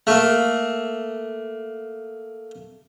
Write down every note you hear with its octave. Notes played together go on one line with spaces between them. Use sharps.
A3 A#3